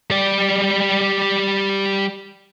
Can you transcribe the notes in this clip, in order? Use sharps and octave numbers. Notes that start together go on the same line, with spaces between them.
G3 D5